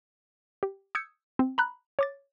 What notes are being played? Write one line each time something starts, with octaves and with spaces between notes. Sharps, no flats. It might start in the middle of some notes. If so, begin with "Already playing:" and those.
G4
D#6 E6 G6 G#6 C#7
C4
A#5 B5 F#6
C#5 D6 A6